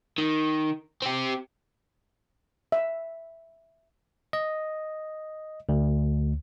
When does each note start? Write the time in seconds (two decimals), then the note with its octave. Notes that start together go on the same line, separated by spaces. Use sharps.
0.18 D#3
1.02 C4 G4
2.72 E5
4.33 D#5
5.69 D2